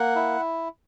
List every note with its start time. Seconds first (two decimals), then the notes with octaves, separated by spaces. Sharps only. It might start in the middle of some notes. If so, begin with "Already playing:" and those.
Already playing: A#3 F#5
0.16 E4